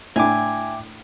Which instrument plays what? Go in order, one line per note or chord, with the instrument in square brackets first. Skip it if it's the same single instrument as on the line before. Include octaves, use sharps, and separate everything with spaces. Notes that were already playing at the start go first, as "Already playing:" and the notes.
[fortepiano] A2 D4 E4 [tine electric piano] E5 G5 D6 [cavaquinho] G#5